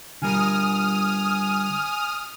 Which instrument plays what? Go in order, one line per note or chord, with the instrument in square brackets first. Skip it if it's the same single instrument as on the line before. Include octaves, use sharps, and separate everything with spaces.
[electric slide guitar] D3 G3 A#4 [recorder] G#5 [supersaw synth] D#6 F6